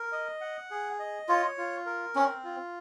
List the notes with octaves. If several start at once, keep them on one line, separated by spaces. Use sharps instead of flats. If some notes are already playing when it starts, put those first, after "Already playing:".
Already playing: A#4
D#5
F#5
G#4
D#5
F4 C#5
F4
A#4
C4 C#4
F4